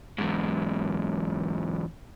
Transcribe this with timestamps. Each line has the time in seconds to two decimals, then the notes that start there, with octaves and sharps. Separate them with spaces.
0.18 E2 G#2